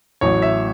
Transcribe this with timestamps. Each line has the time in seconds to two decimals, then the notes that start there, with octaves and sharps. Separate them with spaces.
0.21 A1 A2 F#3 C#5
0.42 E5